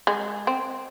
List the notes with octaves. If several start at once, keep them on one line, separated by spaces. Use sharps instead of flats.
G#3
C4